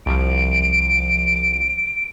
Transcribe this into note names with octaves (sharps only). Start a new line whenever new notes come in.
C2 F3 D7